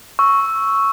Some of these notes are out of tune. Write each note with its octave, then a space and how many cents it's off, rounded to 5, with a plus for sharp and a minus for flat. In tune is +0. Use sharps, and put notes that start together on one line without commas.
C#6 +0 E6 +0